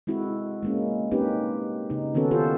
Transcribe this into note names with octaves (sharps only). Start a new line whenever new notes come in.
G#3 C4 E4 F#4
G#3 A#3 C#4
A#3 C4 C#4 D#4 G4 B4
C#3 D#4
D#3 B3 C#4 F#4 A4
F4 G4 A4 C5